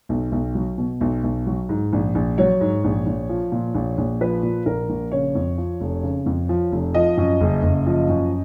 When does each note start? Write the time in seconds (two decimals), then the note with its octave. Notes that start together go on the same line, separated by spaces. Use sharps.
0.09 B1
0.32 B1
0.55 F#3
0.78 B2
1.01 B1
1.23 B1
1.47 F#3
1.69 G#2
1.93 A#1
2.15 A#1
2.38 F#3 C#5
2.61 G#2
2.84 A#1
3.06 A#1
3.29 F3
3.52 A#2
3.74 A#1
3.98 A#1
4.21 F3 B4
4.43 A#2
4.66 A#1 A#4
4.89 A#1
5.12 C#3 C#5
5.35 F2
5.58 F3
5.80 F1
6.03 C#3
6.26 F2
6.49 F3
6.72 F1
6.94 F3 D#5
7.17 F#2
7.41 F#1
7.63 F#1
7.86 F3
8.09 F#2